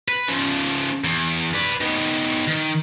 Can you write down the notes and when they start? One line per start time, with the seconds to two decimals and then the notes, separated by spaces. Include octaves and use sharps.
0.09 B4
0.29 C#3 F3
1.04 E2
1.54 B4 D5
1.81 D#3 B3
2.48 D#3